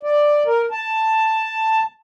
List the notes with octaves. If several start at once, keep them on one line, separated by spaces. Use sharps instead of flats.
D5
A#4
A5